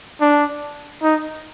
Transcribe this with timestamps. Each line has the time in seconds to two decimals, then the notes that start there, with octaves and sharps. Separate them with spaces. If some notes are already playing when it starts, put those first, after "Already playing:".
0.21 D4
1.03 D#4